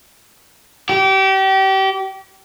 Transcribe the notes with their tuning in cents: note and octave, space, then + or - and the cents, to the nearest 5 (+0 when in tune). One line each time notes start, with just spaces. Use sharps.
G4 -30